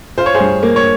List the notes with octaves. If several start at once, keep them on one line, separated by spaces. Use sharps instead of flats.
F4 C5
C#5
G#4 C5
G2
A#3
C#5